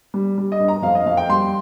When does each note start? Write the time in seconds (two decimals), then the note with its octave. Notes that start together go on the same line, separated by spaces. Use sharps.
0.14 G3
0.38 G3
0.52 D#5
0.59 G2
0.68 A#5
0.82 F2 F5
0.95 D#5
1.06 F2 F5
1.17 G5
1.29 G3 C6